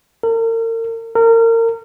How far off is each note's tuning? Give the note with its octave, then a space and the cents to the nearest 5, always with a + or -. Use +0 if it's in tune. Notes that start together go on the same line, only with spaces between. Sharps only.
A#4 -40
A#4 -30